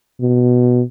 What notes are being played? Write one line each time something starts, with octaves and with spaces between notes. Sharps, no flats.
B2